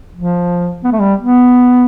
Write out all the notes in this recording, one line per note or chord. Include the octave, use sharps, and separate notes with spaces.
F3
B3
A3
G3
B3